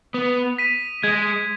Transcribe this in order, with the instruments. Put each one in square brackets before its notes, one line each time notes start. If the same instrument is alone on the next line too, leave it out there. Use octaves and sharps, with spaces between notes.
[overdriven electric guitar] B3 [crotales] D#6
[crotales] B6 D#7
[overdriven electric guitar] G#3 [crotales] G#6